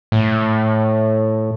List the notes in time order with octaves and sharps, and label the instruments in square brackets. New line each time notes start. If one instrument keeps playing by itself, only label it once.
[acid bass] A2